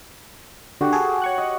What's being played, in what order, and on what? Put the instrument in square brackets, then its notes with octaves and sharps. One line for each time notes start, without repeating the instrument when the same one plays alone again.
[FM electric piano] D3 [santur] F#4 G4
[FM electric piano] G#4 A4
C#5 C#6 F#6
[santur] D#5